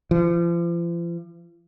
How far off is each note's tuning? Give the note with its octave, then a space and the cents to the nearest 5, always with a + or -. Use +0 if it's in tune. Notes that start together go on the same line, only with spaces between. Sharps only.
F3 -40